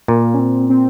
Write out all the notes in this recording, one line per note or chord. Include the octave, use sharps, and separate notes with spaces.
A#2 A#3
C#4
C4
C4